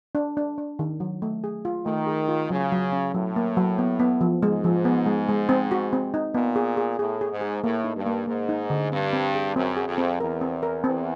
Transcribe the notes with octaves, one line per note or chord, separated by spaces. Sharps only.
D4
D4
D4
D#3
F#3
A3
G#4
F4
D#3 A3
G#4
F4
C#3 F#3
F#3
C#4
A2 F#3
A#3
F#3
B3
B3
F3
G#2 G#3
F3
B3
G#3
G#3
C4
F#4
C4
D#4
A#2 B3
G#4
G#4
A2 G#4
G#4
G#2
G#4
A2 A#3
D#4
G2
A#3
G#2 A#3
D#4
D3
G2 C4
C4
G#4
F#2 C4
G#4
F2
C4
E2 A#4
C4
A#4
E2 C4